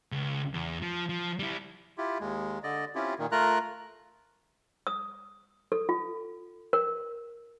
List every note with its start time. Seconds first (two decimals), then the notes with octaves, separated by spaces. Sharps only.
0.12 C#2
0.54 E2
0.82 F3
1.09 F3
1.39 G3 E4
1.98 E4 F4 G4
2.20 D#2 G#3
2.63 D3 D5 D#5
2.95 C4 C#4 E4 F4 G4
3.19 A#2 D#3
3.32 A3 F4 A#4 A#5 F#6
4.87 D#6
5.72 A4
5.89 F4
6.73 A#4